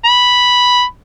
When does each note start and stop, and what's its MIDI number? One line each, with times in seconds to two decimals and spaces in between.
0.05 0.82 83